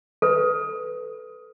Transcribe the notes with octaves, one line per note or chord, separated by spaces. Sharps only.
A4 B4